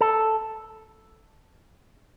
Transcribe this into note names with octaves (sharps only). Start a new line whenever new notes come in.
A4